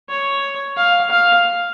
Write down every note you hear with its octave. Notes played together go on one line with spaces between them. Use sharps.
C#5
F5
F5